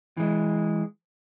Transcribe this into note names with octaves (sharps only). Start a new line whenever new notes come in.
E3 G#3